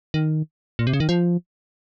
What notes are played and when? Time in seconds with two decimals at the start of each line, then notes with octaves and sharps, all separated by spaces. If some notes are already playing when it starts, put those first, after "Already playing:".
0.14 D#3
0.79 A#2
0.87 C3
0.93 C#3
1.00 D#3
1.09 F3